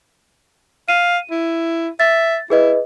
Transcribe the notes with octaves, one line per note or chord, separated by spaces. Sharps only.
F5 D#7
E4
E5 A6
E4 G#4 B4 D#5